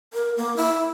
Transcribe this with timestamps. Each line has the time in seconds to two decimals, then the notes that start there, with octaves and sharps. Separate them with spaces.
0.13 A#4
0.37 A#3
0.56 E4